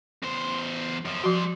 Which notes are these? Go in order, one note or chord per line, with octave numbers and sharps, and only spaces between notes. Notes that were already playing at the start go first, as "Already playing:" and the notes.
E2 C5
F#2 F3
F3 G3 F#4 C6